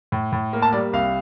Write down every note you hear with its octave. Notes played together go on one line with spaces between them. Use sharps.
A2
A2
A#3
A5
G3 D5
C2 F5